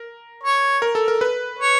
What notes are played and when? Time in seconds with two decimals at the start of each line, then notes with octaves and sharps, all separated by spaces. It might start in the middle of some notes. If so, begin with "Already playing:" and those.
Already playing: A#4
0.44 C#5
0.82 A#4
0.95 A4
1.08 A#4
1.21 B4
1.59 C#5